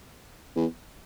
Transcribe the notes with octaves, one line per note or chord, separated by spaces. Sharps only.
E2